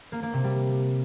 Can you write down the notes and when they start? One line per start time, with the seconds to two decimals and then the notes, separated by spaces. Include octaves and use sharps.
0.12 A#3
0.23 A#3
0.33 C3
0.44 G3